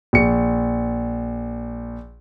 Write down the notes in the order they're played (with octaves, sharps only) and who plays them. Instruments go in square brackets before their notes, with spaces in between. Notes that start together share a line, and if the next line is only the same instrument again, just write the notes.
[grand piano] A#1 C#7